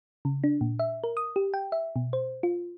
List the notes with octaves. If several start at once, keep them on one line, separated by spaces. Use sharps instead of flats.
C#3
D4
A#2
E5
A#4
D#6
G4
G5
E5
B2
C5
F4